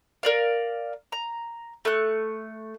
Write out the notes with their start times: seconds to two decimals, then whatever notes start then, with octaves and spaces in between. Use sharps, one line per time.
0.23 A#4 D5 F5
1.12 A#5
1.85 A3 F#6